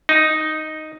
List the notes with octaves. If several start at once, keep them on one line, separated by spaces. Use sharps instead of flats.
D#4